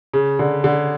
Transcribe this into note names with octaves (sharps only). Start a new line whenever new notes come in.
C#3
D3
D3